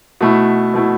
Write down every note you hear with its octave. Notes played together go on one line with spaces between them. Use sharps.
B2 A3 E4
B2 A3 E4